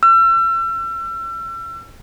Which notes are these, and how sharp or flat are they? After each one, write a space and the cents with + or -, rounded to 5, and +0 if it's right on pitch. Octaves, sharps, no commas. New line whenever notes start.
E6 +40